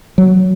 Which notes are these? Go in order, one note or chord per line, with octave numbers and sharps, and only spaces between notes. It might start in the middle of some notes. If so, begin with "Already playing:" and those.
F#3